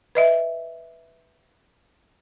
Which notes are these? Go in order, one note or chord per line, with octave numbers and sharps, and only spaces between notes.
B4 D#5 E5